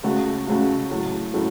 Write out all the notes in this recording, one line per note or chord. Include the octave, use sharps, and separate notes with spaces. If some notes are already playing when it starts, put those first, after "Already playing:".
C#2 C#3 A3 F#4
C#2 C#3 A3 F#4
A2 F#3 A3
A2 F#3 A3